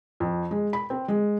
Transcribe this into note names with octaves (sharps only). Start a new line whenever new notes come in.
F2
G#3
B5
C4
G#3